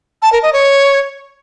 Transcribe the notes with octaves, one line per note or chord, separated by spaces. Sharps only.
A5
A#4
D#5
C#5